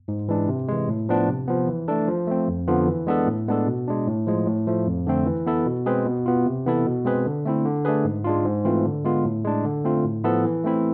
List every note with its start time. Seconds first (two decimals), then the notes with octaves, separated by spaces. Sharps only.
0.08 G#2
0.29 E3 G#3 D4
0.48 C3
0.69 E3 G#3
0.88 A2
1.09 F3 B3 D4
1.28 C3
1.48 F3 B3
1.68 E3
1.88 A3 D4 A4
2.08 F3
2.27 A3 C4
2.48 F2
2.68 D3 F3 B3 F4
2.88 E3
3.07 G#3 B3 D4 A4
3.27 A2
3.48 G#3 B3 D4 A4
3.67 B2
3.88 G#3 D4
4.08 A2
4.27 F3 G#3
4.47 A2
4.67 F3 A3
4.87 F2
5.07 D3 A3 C4
5.26 E3
5.47 B3 E4 A4
5.66 B2
5.86 G#3 C4 G#4 B4
6.06 B2
6.26 B3 F4
6.46 C3
6.66 E3 B3 E4 A4
6.86 B2
7.05 G#3 C4 G#4 B4
7.26 D3
7.45 A3 C4 E4
7.65 D3
7.85 A3 D4 G#4 B4
8.05 G#2
8.24 G#3 D4 F4
8.45 G#2
8.65 E3 A3 C4 F4
8.85 D3
9.05 G#3 B3 F4
9.25 A2
9.44 G#3 D4
9.65 D3
9.85 A3 C4 F4
10.04 A2
10.24 F3 B3 E4 A4
10.45 E3
10.64 A3 C4 E4